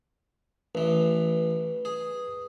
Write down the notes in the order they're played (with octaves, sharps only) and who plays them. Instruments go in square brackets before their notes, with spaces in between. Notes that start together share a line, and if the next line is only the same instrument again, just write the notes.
[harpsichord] A1 E3 [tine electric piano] B4
[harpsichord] G#4